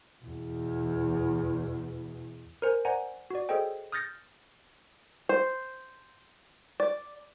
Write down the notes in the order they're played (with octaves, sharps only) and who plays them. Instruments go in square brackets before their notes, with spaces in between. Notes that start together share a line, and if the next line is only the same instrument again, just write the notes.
[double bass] E2 B2
[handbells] A#4 C5 G#5
C5 D5 F#5 G#5 A#5
F#4 D5
G#4 A4 C5 C#5 D#5 G5
D#6 F6 G6 A6 A#6 C#7
[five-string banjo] C5
D5